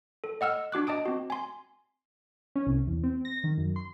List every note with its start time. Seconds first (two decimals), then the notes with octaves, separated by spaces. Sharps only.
0.24 A4
0.41 D#5 F#5 E6 F6
0.72 D4 F#4 D6 F#6
0.87 D#5 A5 D#6 D7
1.05 C4 F#4
1.30 G#5 C6
2.56 C#4
2.67 C2
2.87 E2
3.04 C4
3.25 A#6
3.44 D#3
3.58 F#2
3.76 C6